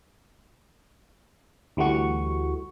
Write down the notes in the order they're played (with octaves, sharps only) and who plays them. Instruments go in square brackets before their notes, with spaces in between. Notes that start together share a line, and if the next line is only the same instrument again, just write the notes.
[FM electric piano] D2 E3 G3 A3 F#4 C#6